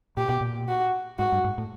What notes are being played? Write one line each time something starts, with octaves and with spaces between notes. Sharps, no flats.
A#2 G4
B2
A#2
F#4
G#2 F#4
G2
G#2
A2